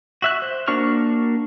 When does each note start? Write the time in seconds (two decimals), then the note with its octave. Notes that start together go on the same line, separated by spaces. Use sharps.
0.22 F#4 E5 F#6
0.42 C5
0.68 A#3 D4 F#4 C#6 F6